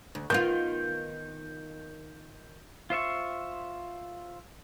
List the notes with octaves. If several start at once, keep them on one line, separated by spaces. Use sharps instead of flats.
D2
D#3 B3 F4 G6
F4 C5 E5 C#6